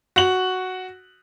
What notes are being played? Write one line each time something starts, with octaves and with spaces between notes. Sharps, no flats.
F#4 F#7